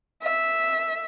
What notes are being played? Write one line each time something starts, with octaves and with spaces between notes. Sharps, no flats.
E5